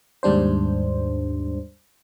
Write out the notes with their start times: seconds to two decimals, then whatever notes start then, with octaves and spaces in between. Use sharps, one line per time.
0.23 D#2 G#2 G3 D4 C5